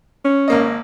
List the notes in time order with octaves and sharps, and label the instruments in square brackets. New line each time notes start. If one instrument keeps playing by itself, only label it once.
[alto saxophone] C#4
[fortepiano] G#1 A#3 D#5